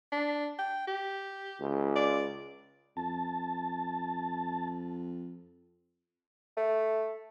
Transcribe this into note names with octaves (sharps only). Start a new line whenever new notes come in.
D4
G5
G4
C#2
D5
F2 A5
A3